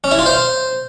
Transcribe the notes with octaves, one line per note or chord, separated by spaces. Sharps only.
C#4
E4
F4
C5